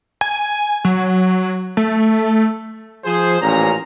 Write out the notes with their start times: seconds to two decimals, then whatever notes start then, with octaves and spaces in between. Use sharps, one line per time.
0.21 G#5
0.85 F#3
1.77 A3
3.04 F3 G#4 C5
3.41 A1 A#2 C#4 A#5